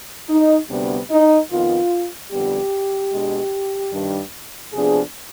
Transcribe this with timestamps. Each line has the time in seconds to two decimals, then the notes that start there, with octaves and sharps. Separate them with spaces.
0.30 D#4
0.70 D2 C3 G3 B3 D4
1.11 D#4
1.51 F2 D#3 B3 F4
2.31 F2 D3 G3 B3 G4
3.13 B2 G#3 D4
3.93 G2 D#3 G3 D4
4.73 C3 F3 B3 D4 G#4